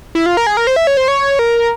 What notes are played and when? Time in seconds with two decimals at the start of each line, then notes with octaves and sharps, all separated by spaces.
0.15 E4
0.26 F4
0.37 A#4
0.47 G#4
0.57 A#4
0.67 C5
0.76 E5
0.87 C#5
0.97 C5
1.08 C#5
1.39 A#4